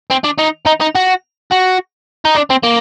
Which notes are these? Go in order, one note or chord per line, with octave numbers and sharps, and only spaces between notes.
C4
D4
D#4
D#4
D#4
F#4
F#4
D#4
D4
C4
A#3